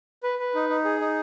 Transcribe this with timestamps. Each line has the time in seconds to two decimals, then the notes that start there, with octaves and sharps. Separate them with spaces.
0.23 B4
0.39 B4
0.55 D#4
0.69 D#4
0.85 G#4
1.01 D#4